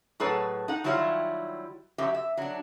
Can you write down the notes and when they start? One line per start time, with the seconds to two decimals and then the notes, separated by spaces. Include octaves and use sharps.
0.20 A2 F#3 G#4 B4 C#5 A5
0.68 D#4 F#5
0.84 D#3 F#3 G3 E4 F4 C#5
1.98 F#2 F#3 G4 E5
2.14 E5
2.37 F#3 D4